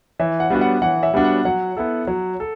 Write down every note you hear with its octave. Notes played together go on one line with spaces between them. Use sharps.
E3 E5
F#5
G3 B3 D4 F#4
F#5
E3 F#5
E5
G3 B3 D4 F#4
F#5
F#3 F#5
B3 E4 A4
F#3
A4